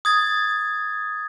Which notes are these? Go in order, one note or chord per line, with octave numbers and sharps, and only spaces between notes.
D#6 G#6 A6